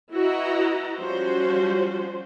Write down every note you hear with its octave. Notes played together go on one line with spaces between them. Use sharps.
E4 F#4 B4 D#5 A#5
F3 G3 C#4 F#4 C5